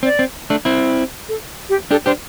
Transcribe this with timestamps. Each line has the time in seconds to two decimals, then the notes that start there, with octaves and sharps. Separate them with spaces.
0.03 C4 D5
0.19 C4
0.50 A3 D4
0.65 C4 E4
1.29 A4
1.69 G4
1.91 D4 G4 A4
2.06 D4 G4 C5